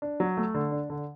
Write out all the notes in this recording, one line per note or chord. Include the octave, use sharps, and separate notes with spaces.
D4
F#3
A3
D3
D4
D3